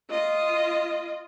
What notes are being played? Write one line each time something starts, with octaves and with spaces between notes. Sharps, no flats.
F4 D#5